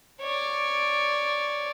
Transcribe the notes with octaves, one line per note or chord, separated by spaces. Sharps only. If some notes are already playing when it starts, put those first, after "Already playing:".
C#5 D5